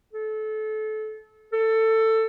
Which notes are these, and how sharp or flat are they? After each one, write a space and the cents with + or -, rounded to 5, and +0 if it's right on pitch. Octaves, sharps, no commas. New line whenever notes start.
A4 -25
A4 +15